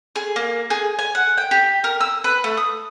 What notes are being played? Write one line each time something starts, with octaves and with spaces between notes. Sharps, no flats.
G#4
A#3
G#4
G#5
F#5
G5
G4
A#4
E6
B4
A3
D#6